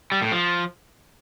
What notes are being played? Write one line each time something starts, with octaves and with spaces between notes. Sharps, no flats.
G3
A2
F3